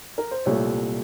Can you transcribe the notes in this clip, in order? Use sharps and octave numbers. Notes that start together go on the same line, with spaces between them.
A#4
C5
C2 A#2 A3 C#5